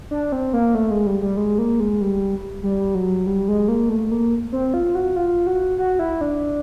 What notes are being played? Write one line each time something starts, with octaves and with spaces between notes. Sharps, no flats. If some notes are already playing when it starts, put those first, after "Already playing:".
D4
C4
A#3
A3
G#3
G3
G3
G#3
A#3
G#3
G3
G3
F#3
G3
G#3
A#3
A3
A#3
C4
F4
F#4
F4
F#4
F#4
E4
D4